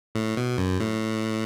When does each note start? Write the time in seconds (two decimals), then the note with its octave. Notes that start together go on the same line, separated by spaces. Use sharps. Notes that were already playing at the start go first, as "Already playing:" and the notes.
0.15 A2
0.37 B2
0.58 F#2
0.80 A2